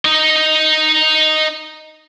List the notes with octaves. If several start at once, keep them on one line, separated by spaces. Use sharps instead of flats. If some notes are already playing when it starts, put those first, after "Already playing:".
D#4 D#5